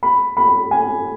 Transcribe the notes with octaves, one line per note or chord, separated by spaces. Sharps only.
B5
B5
G#5